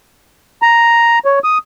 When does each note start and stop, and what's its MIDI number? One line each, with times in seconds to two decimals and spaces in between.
0.62 1.19 82
1.25 1.39 73
1.44 1.58 87